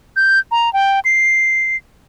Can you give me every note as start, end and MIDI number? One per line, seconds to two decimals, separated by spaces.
0.16 0.39 91
0.51 0.72 82
0.73 1.00 79
1.05 1.77 96